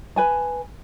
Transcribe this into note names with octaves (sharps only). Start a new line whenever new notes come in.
B4 G#5 A5